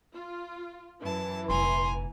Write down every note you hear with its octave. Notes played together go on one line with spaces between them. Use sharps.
F4
F#2 E3 A5
F1 A#1 G#5 A#5 C6